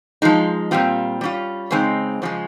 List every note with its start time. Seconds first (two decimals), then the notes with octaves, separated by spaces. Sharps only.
0.22 F3 G#3 D#4
0.71 A#2 G3 C4 F4
1.21 G3 C#4 F4
1.71 C#3 G#3 C4 D#4
2.22 C#3 F3 G#3